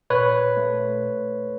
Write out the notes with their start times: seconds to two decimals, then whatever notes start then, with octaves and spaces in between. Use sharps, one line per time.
0.10 A#2 B4 C#5
0.57 A3